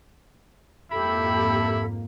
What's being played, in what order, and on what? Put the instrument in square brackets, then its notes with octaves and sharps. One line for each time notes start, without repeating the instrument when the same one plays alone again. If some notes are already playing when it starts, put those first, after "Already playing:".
[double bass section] F2 G#2 A#3 [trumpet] E4 [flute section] G4 A4 [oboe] B5